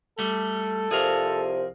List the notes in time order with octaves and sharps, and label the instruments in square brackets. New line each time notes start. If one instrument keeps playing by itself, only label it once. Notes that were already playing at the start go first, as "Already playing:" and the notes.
[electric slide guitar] G3 A3 [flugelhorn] A4
[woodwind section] C2 C3 F3 [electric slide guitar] G#4 A#4 F5